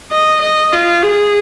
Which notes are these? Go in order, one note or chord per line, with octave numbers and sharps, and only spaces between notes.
D#5
D#5
F4
G#4